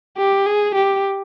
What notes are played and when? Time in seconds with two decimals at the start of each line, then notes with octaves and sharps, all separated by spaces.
0.18 G4
0.46 G#4
0.75 G4